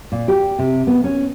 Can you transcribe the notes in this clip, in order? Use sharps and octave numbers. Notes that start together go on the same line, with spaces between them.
A#2
G4
C3
B3
C#4